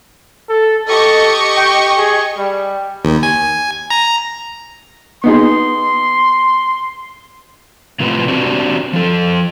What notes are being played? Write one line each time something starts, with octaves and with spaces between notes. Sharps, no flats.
A4
G4 A4 D#5 C#6
G5
G#4
G3
D#2
G#5
A#5
B3 D#4 G#4 C6
A2 C3 C4 F4 B4
C4 D4 F#4 G4
F3 A4